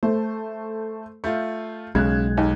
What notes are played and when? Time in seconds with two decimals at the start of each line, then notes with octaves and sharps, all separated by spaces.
0.03 A3 C5
1.24 A3 F4 G6
1.95 B1 C#3 G#3 F#6 G#6
2.37 D#2 D#4